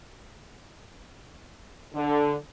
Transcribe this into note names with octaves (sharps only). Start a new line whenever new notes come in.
D3